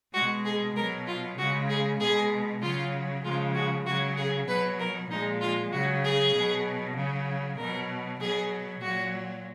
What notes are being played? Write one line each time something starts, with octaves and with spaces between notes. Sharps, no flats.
B2 G#3 F#4
G#4
B2 F#3 A#4
F4
C#3 G#3 F#4
G#4
B2 G#3 G#4
C#3 F#3 F4
C#3 F3 G#3 F4
F#4
C#3 F#3 F#4
G#4
B2 F#3 B4
A#4
A#2 F3 G#3 D#4
F4
C#3 F#3 F#4
G#4
B2 F#3
C#3 F#3
B2 F#3 A#4
B2 F#3 G#4
A#2 F#3 F#4